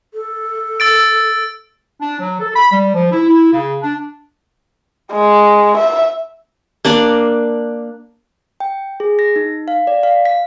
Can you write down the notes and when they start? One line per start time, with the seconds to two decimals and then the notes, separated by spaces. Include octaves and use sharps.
0.14 A4
0.80 E6 A6 D7
2.01 D4
2.20 F#3
2.40 A4
2.55 B5
2.72 G3
2.94 F3
3.11 E4
3.28 E4
3.53 C#3
3.82 D4
5.12 G#3
5.77 E5
6.85 A#3 D4 D5
8.60 G5
9.00 G#4
9.19 A#6
9.36 D#4
9.68 F5
9.87 D5
10.03 F5
10.25 B6